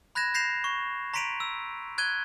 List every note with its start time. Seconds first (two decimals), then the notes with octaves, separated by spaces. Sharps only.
0.15 B5 F#6 G#6 A#6 E7
0.34 G6 A#6 C7 E7 F7
0.64 C#6
1.14 A#5 C6 B6 D7 D#7 F7
1.40 E6
1.98 F#6 G#6 D#7 G7